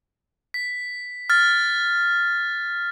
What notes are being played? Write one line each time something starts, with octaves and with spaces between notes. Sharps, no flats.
B6
F6 A6